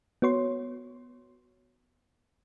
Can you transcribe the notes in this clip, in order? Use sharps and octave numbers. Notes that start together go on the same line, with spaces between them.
B3 F#4 C#5 C6